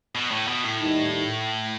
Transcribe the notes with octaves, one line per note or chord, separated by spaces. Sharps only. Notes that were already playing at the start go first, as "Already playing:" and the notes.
B2
A2
B2
A2
D#2 D#3 G3 D#4